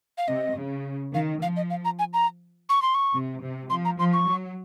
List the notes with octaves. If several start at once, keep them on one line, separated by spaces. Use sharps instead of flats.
F5
C3 D#5
C#3
D#3 F5
F3 F5
D#5
F5
A#5
G#5
A#5
C#6
C6
C#6
C3
C3
F3 C6
A#5
F3 C6
C#6
F#3